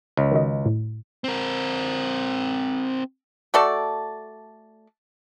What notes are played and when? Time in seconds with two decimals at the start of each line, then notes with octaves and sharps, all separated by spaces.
0.17 C#2
0.32 D#3 F#4 D#5
0.66 A2
1.24 C4 A#4
3.54 A3 F#4 A4 D5